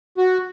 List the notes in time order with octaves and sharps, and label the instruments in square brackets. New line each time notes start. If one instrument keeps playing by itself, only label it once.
[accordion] F#4